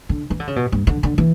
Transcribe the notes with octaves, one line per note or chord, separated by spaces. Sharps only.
D3
E3
D3
C#3
B2
G2
D3
D3
E3